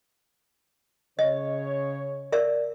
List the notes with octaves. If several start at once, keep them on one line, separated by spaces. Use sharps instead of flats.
C#3 C#5 D#5
A#4 D5 E5